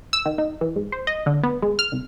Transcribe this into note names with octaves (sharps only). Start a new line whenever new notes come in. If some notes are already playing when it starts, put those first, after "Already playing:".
E6
D#3
D#4
E3
G#2
C5
D#5
D3
B3
G#3
F6
C2